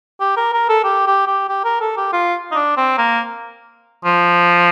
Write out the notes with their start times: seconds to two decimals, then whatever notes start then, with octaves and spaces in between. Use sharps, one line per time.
0.20 G4
0.37 A#4
0.53 A#4
0.69 A4
0.84 G4
1.07 G4
1.27 G4
1.49 G4
1.64 A#4
1.81 A4
1.97 G4
2.13 F4
2.52 D#4
2.55 D4
2.77 C4
2.98 A#3
4.05 F3